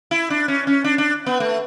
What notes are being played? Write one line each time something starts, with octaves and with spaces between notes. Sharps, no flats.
E4
D4
C#4
C#4
D4
D4
B3
A3